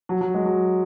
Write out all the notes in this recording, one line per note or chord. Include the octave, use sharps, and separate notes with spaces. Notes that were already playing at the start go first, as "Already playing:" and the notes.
F#3
F#3
G#3
F#3